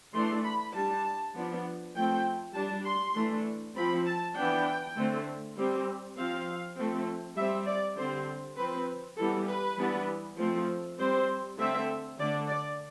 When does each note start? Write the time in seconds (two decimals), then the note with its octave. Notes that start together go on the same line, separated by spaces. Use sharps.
0.14 E3 A3 D4 C6
0.45 B5
0.74 G3 D4 A5
1.35 F3 B3 D4
1.94 F3 A3 C4 G5
2.55 G3 D4 A5
2.86 C6
3.15 E3 A3 D4
3.75 F3 C4 B5
4.06 A5
4.35 E3 B3 D4 G5
4.96 D3 A3 C4
5.57 G3 C4
6.17 F3 C4 F5
6.77 F3 A3 C4
7.37 G3 C4 E5
7.67 D5
7.97 D3 G3 C4 C5
8.57 F3 C4 B4
9.17 E3 G3 B3 A4
9.47 B4
9.77 E3 G3 B3 D4
10.38 F3 A3 C4
10.98 G3 C4 C5
11.58 D3 A3 C4 E5
12.18 D3 A3 D4 D5
12.48 D5